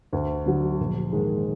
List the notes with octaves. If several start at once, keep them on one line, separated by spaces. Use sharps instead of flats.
D2
D3 F#3
A#1
G#2 D#3 G#3